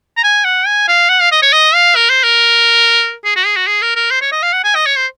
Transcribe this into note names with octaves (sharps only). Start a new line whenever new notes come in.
A#5
G#5
F#5
G#5
F5
F#5
F5
D#5
C#5
D#5
F5
A#4
C5
A#4
G#4
F#4
G#4
F#4
G#4
A#4
A#4
C5
C#5
D#5
F5
F#5
G#5
D#5
C#5
C5